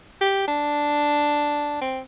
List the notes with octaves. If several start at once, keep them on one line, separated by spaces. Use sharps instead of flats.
G4
D4
C4